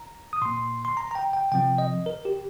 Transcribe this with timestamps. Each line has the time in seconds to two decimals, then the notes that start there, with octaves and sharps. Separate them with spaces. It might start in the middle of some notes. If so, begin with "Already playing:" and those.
Already playing: A#5
0.33 D#6
0.42 A#2 A#3 C6
0.85 C6
0.97 A#5
1.11 A#5
1.15 G5
1.33 G5
1.52 C3 F3 C4 G5
1.78 D#5
2.06 A#4
2.25 G4